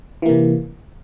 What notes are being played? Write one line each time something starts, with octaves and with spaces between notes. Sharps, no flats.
C3 E3 A#3